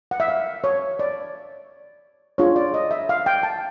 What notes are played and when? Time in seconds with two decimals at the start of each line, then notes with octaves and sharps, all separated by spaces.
0.11 F#5
0.20 E5
0.28 F5
0.64 C#5
0.99 D5
2.38 D4 F4 G#4 C#5
2.56 D5
2.74 D#5
2.91 E5
3.09 F5
3.26 G5
3.43 A5